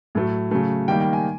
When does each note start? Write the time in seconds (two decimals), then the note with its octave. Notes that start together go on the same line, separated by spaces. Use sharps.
0.15 A2 F#3 A3
0.51 C#3 F#3 A3
0.88 D#3 G3 A#3 G5
1.01 G5
1.13 G#5